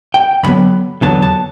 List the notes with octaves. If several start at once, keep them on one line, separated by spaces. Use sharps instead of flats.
G5
E2 D3 F#3 B3 B5
E2 D3 F#3 B3 A5
A5